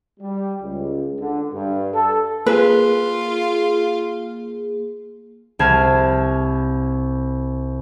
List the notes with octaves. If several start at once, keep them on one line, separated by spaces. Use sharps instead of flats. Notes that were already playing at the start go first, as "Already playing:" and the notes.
G3
C#2
D3
G2
A4
A#3 F4 G#4 B4
C2 A5 B5 F6 G#6 C7